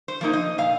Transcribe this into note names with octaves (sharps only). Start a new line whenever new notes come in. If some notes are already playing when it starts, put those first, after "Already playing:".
C5
F3 A#3 D#4
D#5
A#2 F5